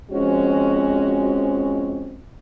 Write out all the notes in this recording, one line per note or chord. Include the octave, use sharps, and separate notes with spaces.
F2 F3 G#3 C#4 F#4